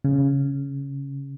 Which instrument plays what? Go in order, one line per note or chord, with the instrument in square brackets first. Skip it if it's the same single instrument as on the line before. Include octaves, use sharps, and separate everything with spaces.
[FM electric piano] C#3